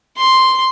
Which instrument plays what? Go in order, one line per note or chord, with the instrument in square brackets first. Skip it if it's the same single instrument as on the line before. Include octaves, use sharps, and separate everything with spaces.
[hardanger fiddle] C6